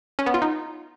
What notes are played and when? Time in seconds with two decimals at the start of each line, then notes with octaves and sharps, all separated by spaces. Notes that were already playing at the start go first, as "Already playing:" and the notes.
0.19 C#4
0.26 B3
0.34 F4
0.42 D#4